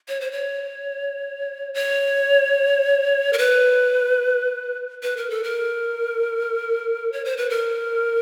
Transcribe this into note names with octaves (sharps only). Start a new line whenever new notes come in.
C#5
C5
C#5
C#5
A#4
B4
B4
A#4
A4
A#4
C#5
C5
B4
A#4